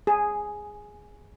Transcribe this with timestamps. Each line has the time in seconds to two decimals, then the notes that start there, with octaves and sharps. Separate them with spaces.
0.07 G#4